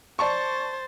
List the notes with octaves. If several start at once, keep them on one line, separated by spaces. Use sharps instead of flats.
C5 D5 A5 C#6 A6